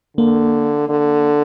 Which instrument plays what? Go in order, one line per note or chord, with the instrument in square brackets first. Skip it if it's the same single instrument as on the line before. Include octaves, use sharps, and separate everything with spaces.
[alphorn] D3 [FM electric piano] A#3
[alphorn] D3